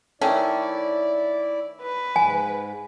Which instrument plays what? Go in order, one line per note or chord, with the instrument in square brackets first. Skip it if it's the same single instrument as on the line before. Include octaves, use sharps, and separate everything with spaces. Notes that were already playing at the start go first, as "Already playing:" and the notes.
[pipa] D#3 A3 C#4 [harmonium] E4 D5
[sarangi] B4
[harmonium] G#2 [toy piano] G#5